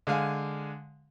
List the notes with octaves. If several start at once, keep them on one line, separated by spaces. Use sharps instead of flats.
D3 G#3 F5 G#5